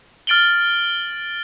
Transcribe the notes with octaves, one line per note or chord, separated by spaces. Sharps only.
F6 A6 D7 F#7 G7